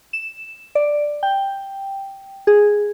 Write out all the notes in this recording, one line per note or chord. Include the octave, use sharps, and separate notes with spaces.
E7
D5
G5
G#4